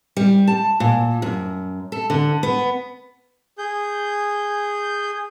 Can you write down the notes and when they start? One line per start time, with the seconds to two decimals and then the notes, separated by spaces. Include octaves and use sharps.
0.17 G3
0.48 A5
0.80 A#2
1.22 F#2
1.92 A4
2.10 D3
2.43 B3
3.58 G#4 G6